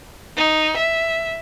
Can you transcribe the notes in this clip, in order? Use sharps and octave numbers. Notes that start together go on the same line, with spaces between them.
D#4
E5